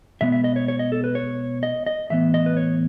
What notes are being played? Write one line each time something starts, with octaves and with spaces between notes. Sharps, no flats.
B2 G#3 B3 E5
E5
D#5
C#5
C#5
D#5
A4
B4
C#5
D#5
D#5
A2 E3 B3 E5
D#5
B4
C#5